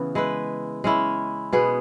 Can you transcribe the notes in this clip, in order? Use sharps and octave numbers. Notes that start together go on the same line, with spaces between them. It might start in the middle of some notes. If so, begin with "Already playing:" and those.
Already playing: C#3 E3 B3
G#3 E4 B4
G#3 C#4 E4
B2 B3 G#4